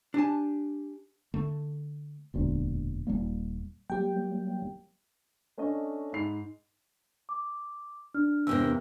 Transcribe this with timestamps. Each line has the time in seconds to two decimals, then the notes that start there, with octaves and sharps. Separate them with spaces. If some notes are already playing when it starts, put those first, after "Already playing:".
0.14 D4 G4 G#5 A5
1.34 D3 A3
2.34 E1 D2 A#2
3.07 D#1 G#1 G3 A#3
3.90 F#3 G3 A#3 G4 G5
5.58 A3 C#4 D4 D#5
6.13 G#2 B5 C7 F7
7.29 D6
8.15 D4 F6
8.47 E2 C3 A#3 E6